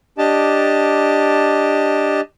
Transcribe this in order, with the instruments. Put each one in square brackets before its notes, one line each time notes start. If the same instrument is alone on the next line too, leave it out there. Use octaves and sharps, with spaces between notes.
[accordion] D4 G4 D#5 A5